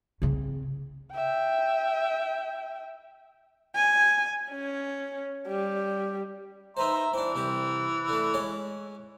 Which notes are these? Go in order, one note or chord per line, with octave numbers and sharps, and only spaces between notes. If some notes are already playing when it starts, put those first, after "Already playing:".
C#3 C4
E5 G5
G#5
C#4
G3
D#4 B4 C5 E5 A#5 C6
E3 C4 D4
C2 C4 G4
D3 A3
G#3 C#4 C#5